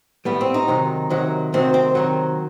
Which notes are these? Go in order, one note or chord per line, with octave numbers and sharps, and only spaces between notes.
A2 G3 B3
C4
D#4
C3 D#3 F#3
C3 D#3 F#3
C3 D#3 F#3 C4
C4
C3 D#3 F#3